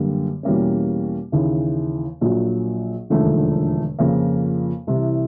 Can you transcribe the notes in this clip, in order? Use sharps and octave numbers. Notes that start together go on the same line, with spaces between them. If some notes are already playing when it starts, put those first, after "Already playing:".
Already playing: F#2 D3 G3 A#3
E2 B2 G3 A#3 C#4
D#2 C#3 E3
A#1 A#2 F#3
E1 D#2 D3 F3 A3
F2 C#3 F3 A#3
C2 C3 E3